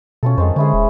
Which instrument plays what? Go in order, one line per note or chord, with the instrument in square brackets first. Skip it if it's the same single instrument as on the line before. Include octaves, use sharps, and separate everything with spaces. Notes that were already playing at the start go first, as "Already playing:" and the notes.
[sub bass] B2 [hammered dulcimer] C#4 F4 A4
[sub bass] F2 [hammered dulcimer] D#3 G#3 C5
[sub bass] D3 [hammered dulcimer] C#4 E4 G#4
[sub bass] D#1